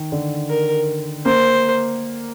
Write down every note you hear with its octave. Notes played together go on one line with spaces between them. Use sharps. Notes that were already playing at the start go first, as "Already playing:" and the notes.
Already playing: D#3
D3
A#4
A#3 C5